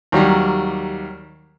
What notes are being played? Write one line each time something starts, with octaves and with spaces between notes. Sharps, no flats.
D#2 F#3 G3 A#5